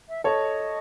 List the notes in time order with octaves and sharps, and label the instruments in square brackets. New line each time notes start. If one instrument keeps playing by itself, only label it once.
[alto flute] E5
[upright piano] A4 C#5 [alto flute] D#5